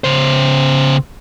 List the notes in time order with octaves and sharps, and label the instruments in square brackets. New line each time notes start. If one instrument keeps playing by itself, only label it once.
[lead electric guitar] C#3 C5